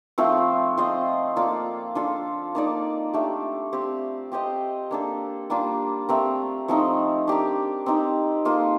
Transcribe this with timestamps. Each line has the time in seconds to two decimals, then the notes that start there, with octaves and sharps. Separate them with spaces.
0.18 F3 A3 C4 F4
0.77 C4 F4 C5 D#5
1.36 A#3 F4 A4 D5
1.95 D4 F4 A4
2.55 A#3 D#4 A4 D5
3.13 A3 D4 G4
3.73 C4 G4 C5
4.32 C4 G4 C5 D#5
4.91 A#3 D4 A4
5.50 G3 A#3 D4 F4
6.09 A3 C4 G4 A#4
6.68 F3 A3 C4 D#4
7.27 D4 G4 A#4
7.86 C4 D#4 G4
8.45 A#3 F4 A4 D#5